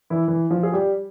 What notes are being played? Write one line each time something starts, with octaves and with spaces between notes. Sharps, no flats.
E3 E4
E3 E4
F3 F4
G#4
G3 G4